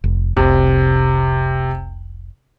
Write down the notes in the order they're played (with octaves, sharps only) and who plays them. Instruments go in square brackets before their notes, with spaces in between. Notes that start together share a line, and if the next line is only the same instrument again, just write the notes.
[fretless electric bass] F1
[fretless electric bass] F1 C2 [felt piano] C3